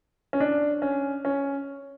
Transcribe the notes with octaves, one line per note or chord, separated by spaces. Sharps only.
C#4
D4
C#4
C#4